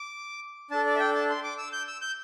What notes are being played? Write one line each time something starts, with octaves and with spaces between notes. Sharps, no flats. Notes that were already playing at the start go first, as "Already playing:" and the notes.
Already playing: D6
D4 A4 A5
D5
E5
G5
A5
C6
D6
E6
G6
E6
G6